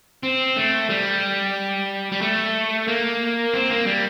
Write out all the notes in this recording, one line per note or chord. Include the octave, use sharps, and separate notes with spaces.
C4
A3
G3
G3
A3
A#3
C4
A#3
G3